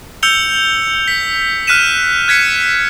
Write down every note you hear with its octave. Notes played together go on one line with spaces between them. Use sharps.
E6 G6 C#7 F7 G7
B6
F6 F#6 B6 D#7 E7
F#6 G#6 B6 C#7